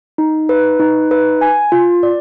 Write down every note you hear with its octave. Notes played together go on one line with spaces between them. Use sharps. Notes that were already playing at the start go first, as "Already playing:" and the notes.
D#4
B4
D#4
B4
G#5
F4
D5